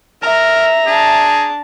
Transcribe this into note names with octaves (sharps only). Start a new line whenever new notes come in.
A#4 E5 A#5
D4 G#4 A5